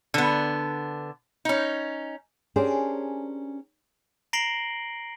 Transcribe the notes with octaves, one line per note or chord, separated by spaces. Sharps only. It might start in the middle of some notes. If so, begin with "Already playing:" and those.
D3 B3
C#4 D#4
C#4 D4 G4 G#4 A#4 C5
A#5 A#6 C7 D7 F#7 G7